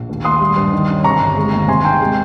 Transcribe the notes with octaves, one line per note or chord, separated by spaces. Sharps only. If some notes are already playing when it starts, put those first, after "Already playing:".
Already playing: A#1
D#2
D#2 C6 D#6
G3
G2
D#3
C#4
C3 A#5 C#6
G1
G#3
D#2
C3 G#5 C6
D#3 G5 A#5
G#3